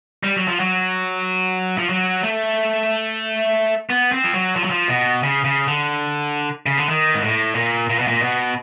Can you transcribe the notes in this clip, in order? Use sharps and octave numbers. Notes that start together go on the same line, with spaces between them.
G3
F#3
F3
F#3
F3
F#3
A3
B3
C4
F3
F#3
F3
F#3
F3
B2
C#3
C#3
D3
C#3
D3
D#3
G#2
A2
A#2
A#2
B2
A#2
B2